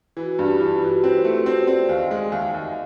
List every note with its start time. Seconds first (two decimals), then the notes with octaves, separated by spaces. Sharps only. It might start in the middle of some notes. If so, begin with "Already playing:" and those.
0.17 E3 F#4
0.39 G2 G4
0.60 E3 F4
0.82 E3 F#4
1.04 C4 B4
1.24 A3 C5
1.46 C4
1.67 C4 D5
1.89 D#2 D#5
2.11 G#3
2.32 D#2 E5
2.54 D#2